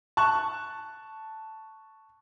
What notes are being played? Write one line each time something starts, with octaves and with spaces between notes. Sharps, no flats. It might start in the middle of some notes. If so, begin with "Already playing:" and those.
A5 C#6 F#6